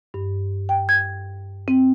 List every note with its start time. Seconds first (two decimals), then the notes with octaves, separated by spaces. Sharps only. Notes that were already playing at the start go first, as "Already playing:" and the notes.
0.14 G2
0.69 G5
0.89 G#6
1.68 C4